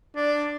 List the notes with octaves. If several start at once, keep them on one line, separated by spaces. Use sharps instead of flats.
D4